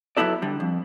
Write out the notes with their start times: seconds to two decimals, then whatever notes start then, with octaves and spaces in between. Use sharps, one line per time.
0.17 F#3 G3 B3 E4 A4 D5
0.42 D3 G3
0.60 F2